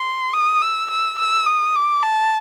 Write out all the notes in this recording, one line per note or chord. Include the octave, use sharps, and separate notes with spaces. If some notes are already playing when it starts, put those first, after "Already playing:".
Already playing: C6
D#6
E6
E6
E6
D#6
D6
A5